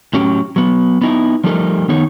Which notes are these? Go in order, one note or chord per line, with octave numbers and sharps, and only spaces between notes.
A2 F#3 C#4 G4
F#3 B3
B3 D#4 E4
F3 G3 A3 D#4 A4 A#4
D#3 B3 D#4 C#5